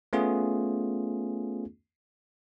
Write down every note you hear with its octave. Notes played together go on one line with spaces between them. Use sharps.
A3 B3 C#4 F4 G#4